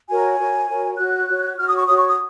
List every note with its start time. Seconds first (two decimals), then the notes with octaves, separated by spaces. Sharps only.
0.08 F#4 A#4 C#5 G#5
0.38 F#4 A#4 C#5
0.67 F#4 A#4 C#5
0.97 F#4 C#5 F#6
1.28 F#4 C#5
1.57 F#4 C#5 F6
1.67 D#6
1.77 C#6
1.87 F#4 C#5 D#6
1.97 C#6
2.07 D#6